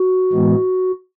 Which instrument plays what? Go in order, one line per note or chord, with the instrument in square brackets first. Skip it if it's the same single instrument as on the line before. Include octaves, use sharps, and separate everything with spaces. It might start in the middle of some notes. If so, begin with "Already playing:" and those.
Already playing: [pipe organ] F#4
A2 E3 G#3 B3